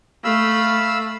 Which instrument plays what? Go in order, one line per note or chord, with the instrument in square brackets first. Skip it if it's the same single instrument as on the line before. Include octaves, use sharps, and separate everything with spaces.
[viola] A3 [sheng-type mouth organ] F5 B5 E6